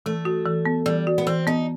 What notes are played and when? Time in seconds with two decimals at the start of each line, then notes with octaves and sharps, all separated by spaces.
0.06 E3 A3
0.25 F#4
0.46 E3
0.66 B3
0.86 E3 G3
1.07 F#4
1.18 B3
1.27 E3 C4
1.47 B3 D#4